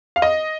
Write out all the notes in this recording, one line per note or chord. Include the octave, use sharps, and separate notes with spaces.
F5
D#5